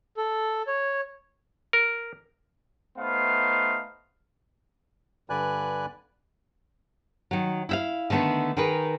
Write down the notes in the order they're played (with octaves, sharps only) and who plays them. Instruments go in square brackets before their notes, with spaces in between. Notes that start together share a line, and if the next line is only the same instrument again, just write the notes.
[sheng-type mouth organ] A4
C#5
[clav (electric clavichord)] A#4
[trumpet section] A3 B3 D#4 C5 F5
[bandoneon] G2 D3 B4 D5 G#5 F#6
[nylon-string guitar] D#3 F#3
E4 E5 F5
D3 D#3 A3 B3 D4
D#3 G#4 A#4 B4